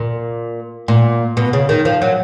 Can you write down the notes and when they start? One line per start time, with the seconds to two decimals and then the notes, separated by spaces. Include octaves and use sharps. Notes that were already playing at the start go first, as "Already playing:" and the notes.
Already playing: A#2
0.88 A#2
1.37 B2
1.53 C#3
1.69 D#3
1.85 F3
2.02 F#3